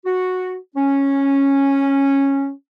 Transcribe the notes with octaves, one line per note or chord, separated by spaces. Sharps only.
F#4
C#4